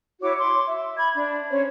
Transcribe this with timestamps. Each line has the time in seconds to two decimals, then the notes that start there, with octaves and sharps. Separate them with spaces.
0.22 E4 F#4 C#5 D6
0.38 C6 D6
0.67 E5
0.97 B5 G#6
1.14 D4
1.50 C#4 C5 C#5